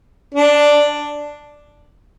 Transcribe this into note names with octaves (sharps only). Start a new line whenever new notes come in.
D4